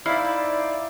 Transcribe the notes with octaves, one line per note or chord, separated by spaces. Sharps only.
D#4 E4 C5 D5 F5